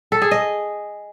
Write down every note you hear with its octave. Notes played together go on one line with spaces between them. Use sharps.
A4
G#4
D#5